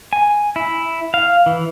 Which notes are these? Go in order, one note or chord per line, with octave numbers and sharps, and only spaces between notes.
G#5
E4
F5
E3